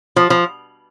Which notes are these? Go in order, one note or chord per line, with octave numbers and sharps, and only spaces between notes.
F3
F3